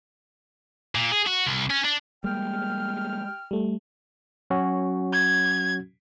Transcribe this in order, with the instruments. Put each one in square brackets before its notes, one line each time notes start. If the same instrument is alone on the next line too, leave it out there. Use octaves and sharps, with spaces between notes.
[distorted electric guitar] A#2
G#4
F#4
C2
C#4
D4
[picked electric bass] G3 G#3 A#3 [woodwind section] G5 F6
[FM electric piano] G3 A3
[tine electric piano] F#3 C#4 F#4
[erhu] G#6